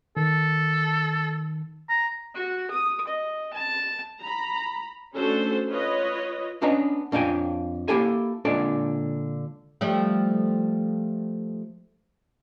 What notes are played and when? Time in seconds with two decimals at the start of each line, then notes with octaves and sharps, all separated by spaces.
0.17 D#3 A4
1.89 A#5
2.35 F#4
2.71 D#6
3.07 D#5
3.54 A5
4.21 A#5 B5
5.15 A3 C#4 D4 F#4 A4 C5
5.70 F4 B4 C#5 D#5
6.62 B3 C#4 D4 B4 D#5 A#5
7.12 F2 D4 F5 G5 G#5
7.88 A#3 E4 G4 A4 G#5
8.45 A#2 D3 G#3 D4 A4 D5
9.81 F3 G3 A3